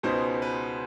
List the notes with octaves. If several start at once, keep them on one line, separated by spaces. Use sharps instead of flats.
C#2 B2 G#3 B3 D#4 C5
B4